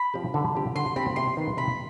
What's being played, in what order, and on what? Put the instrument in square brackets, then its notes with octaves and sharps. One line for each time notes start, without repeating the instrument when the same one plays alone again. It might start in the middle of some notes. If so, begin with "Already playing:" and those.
Already playing: [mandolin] B5
[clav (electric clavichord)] F3 C4 G4
D3
F3 C4 G4
[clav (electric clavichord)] D3 [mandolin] C6
[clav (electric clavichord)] F3 C4 G4 [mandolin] B5
[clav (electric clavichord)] C3 [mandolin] C6
[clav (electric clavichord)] D#3 B3
[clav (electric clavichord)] C3 [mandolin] B5